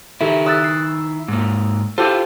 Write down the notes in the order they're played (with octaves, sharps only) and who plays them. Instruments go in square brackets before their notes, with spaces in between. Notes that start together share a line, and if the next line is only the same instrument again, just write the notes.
[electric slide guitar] D#3 E4 [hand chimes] G4 A4 E5
[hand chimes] D#6 F#6 A6 [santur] E6
[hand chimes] C7
[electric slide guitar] G#2 A#3
[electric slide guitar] E4 F4 [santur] G4 A4 [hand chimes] C5 E6